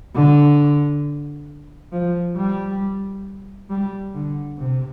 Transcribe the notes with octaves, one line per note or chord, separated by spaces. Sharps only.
D3
F3
G3
G3
D3
C3